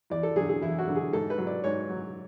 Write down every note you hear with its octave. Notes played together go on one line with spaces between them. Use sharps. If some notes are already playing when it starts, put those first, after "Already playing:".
E2 D5
A4
D3 F#3 G#4
G#4
E2 E4
F#4
D3 F#3
G#4
G#2 A4
B4
F#3
D5
G#2 C#5
F#3